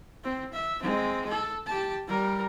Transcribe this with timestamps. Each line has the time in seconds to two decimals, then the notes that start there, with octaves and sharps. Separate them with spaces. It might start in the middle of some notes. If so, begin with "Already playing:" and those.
0.24 C4
0.54 E5
0.82 G#3 C4
1.29 A4
1.66 G4 A5
2.07 G3 A#4